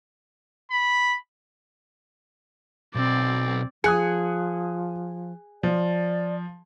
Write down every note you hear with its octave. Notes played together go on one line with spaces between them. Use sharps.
B5
B1 C4 D5
F3 G#4 D#6 F#6 C#7
F3 D5